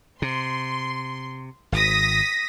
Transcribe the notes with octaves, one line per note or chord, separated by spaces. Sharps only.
C3 C6
G#1 D#6 A#6 B6